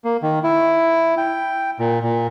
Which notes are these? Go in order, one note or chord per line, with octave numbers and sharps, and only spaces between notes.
A#3
D#3
E4
G5
A#2
A#2